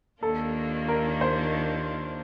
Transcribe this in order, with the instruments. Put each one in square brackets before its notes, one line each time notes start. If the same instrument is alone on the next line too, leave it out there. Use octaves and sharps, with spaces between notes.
[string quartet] D#2 D#3 A#3 D4 F4 [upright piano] A4
[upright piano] A#4
C5